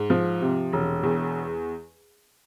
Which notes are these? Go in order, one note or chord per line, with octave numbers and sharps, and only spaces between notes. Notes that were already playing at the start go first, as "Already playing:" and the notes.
Already playing: G#2
F3
C3
E1
E2